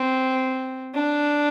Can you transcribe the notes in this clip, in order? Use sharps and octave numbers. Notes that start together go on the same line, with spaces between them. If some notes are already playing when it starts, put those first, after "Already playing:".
Already playing: C4
D4